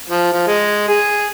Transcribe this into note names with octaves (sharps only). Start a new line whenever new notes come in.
F3
F3
G#3
G#4